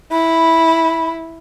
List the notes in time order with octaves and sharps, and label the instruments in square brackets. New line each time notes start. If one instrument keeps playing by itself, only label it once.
[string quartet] E4 [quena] B5